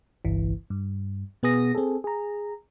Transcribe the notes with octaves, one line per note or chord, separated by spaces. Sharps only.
G1 C2 E3
G2
B2 B3 G#4 D#6 A#6
C4 G#4 A4
G#4 A#5